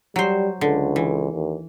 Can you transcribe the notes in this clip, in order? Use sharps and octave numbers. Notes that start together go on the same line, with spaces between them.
F#3 G3 C5
C#2 D3
E3
D#2